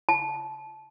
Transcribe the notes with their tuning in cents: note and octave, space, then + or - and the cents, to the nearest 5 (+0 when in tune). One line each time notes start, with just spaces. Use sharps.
A5 -20